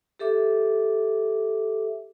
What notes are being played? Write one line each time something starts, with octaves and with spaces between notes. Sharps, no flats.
G4 A4 E5 D6